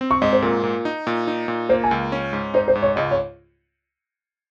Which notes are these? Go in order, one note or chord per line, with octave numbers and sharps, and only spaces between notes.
C4
C#6
G#2 D#5
C5
A#2 A#4
A#2
D#4
A#2
D#4
A#2
A#3 C5
G#5
C#2
C#4
G#2
D#4 C5
C5
G#2
C#5
C#2 D#5
C#5